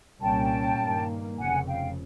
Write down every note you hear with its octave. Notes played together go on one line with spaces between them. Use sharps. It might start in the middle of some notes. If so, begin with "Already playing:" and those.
C2 A#2 G3 A#3 C#4 G5 A5
G2 D#3 G3 A#3
F1 F2 C#3 F#5 G#5
F5 G5